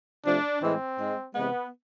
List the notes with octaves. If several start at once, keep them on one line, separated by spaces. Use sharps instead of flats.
C3 F3 A3 D4
A2 E3 G#3 C4
G#2 G#3
C3 E3 G#3 B3